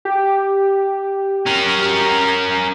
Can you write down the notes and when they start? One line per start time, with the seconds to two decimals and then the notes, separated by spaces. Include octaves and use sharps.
0.05 G4
1.46 C#4 A#4